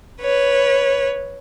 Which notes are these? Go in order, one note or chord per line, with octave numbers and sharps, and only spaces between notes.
B4 C#5